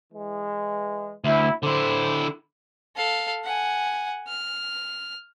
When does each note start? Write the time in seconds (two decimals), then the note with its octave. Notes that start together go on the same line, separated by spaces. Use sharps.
0.13 E3 G#3
1.24 D2 E4
1.63 D3 E4 C5
2.96 A4 F5
3.44 F#5 G#5
4.28 F6